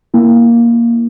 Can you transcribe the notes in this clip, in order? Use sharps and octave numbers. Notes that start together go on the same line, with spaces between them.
A#3 E4